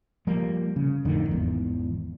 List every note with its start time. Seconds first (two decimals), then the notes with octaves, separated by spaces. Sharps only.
0.27 F3 G3 A#3
0.76 C#3
1.05 F2 A2 D3 D#3
1.29 G#1 E2